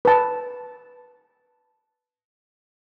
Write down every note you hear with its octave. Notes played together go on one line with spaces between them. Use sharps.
B4 A5